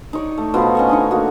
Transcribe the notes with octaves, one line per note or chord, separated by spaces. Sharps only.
D#4 C#5 D5
A3
B2 F3 D#4 B4
C#4 D#5 C#6
D3 D#4 C#5
A#3 F#4